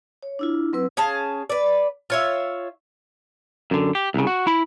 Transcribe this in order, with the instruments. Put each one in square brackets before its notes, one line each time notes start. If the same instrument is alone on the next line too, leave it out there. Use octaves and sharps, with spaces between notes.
[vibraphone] C#5
D4 E4 F4
F#3 C4 B4 E6
[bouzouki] C#4 G#4 F5 A5
B4 D5
F4 C#5 E5
[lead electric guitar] F#2 D3
G4
C2 C#3
F#4
E4 B5